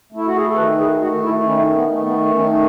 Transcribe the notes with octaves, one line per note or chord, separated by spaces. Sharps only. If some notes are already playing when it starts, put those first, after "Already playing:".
A3 E4
F#4
G#4
A4
D#3 B4
G#4
A3 F#4
E4
D#3 C#4
B3
A3
B3
D#3 C#4